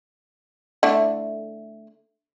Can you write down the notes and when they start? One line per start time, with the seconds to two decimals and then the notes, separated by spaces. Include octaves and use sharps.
0.83 D3 A3 E4